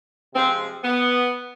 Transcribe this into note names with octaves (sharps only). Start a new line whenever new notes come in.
C3 F3 G#3 C4
B3